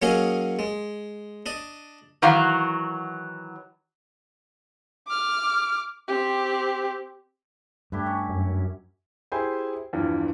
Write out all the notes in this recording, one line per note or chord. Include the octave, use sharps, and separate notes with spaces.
F#3 A#3 C#4 D#4 G#4 D#5
G#3
D4 D#5
D#3 E3 F#3 F#4 F5
D6 F6
C4 G4
G2 A3 D4 E4 G4
C#4
F#2
E4 G4 G#4 C5 G#5 B5
E2 G2 E3 F3